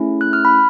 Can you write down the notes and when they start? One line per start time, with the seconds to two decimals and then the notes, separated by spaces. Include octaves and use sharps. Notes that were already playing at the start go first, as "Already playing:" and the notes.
Already playing: A3 C#4 E4 G#4
0.21 F#6
0.33 F6
0.45 B5